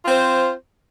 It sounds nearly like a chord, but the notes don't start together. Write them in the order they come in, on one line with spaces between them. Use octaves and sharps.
F4 C4 C5